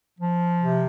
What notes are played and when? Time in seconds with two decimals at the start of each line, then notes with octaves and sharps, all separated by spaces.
0.19 F3
0.63 C3